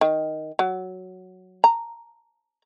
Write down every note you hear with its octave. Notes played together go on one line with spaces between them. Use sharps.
D#3
F#3
A#5